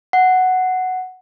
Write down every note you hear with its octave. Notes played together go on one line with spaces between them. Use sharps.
F#5